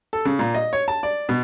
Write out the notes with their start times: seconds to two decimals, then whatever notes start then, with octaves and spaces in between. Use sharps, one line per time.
0.13 A4
0.25 C#3
0.39 A#2
0.55 D#5
0.73 C#5
0.88 A5
1.03 D5
1.29 B2